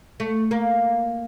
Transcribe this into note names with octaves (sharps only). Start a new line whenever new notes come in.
A3
A#3